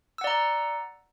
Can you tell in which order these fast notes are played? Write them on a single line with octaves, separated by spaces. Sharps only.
E6 F#5 D5 A#5